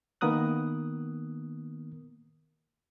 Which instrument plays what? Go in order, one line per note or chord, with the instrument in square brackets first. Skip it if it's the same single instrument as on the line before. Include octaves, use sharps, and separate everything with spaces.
[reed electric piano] D#3 A#3 B3 A#4 D#6 F#6